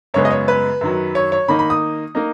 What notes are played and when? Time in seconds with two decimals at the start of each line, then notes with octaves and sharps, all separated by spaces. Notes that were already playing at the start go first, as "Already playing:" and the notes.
0.14 F#2 C#3 G#3 B3 C#5
0.25 D#5
0.31 C#5
0.48 B4
0.81 F#2 D#3 F#3
1.15 C#5
1.32 C#5
1.48 D#3 A#3 D#4 B5
1.59 B5
1.70 D#6
2.15 A#3 D#4